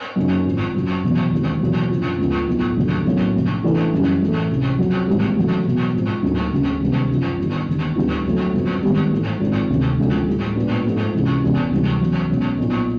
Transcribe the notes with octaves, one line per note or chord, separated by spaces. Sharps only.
F#2 C#3 F#3 A#3 D#4
G#1 G#2 F3
F#2 C#3 F#3
F1 E2 B2 F#3
D#2 C#3 E3 G#3 C4
E2 B2 F#3 A#3
F#2 D3 F3
D2 C#3 F3 G#3 B3
B1 A2 F3
F1 D#2 D3 F#3 A3
B1 A2 F#3 A#3 C#4
F1 F2 D3
E2 C#3 E3 A3 D4
F#1 F#2 C#3 E3 G3
A1 A2 E3 A3
C#2 C3 E3
F2 C#3 F#3
G#1 G#2 E3 G3 A#3
F1 E2 C#3 F#3 A3
E2 B2 F#3
G#2 F3 G#3 C4
D2 D3 F#3 A#3 D#4
E1 D2 C#3
C#2 C3 D#3 G3 B3
F#2 C#3 F3
G1 G2 D#3
E1 D#2 D3
D2 D3 G3 B3 E4
F2 D3 F#3 A3
G1 F2 C#3 F#3 B3
G#1 G#2 D#3 G3 B3
G#2 E3 A3
G#1 G#2 F3 G#3 C4
E1 D2 C3 D#3
E1 D2 C#3 F3 G#3
A2 E3 G3
A#2 F3 G#3 B3 D4
G#2 F3 A3 C4
C#2 C3 E3 G#3
E1 E2 C#3 E3 G#3
D2 C3 E3 G3
E2 C#3 F#3
B1 B2 G#3 C#4
B1 A#2 F3